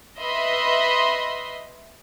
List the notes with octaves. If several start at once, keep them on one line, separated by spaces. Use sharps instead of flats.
B4 D#5 E5 B5 C6